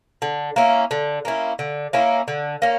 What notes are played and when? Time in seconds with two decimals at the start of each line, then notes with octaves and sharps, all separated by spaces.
0.22 D3
0.56 A#3 C#4 E4
0.91 D3
1.25 A#3 C#4 E4
1.59 D3
1.93 A#3 C#4 E4
2.28 D3
2.62 A#3 C#4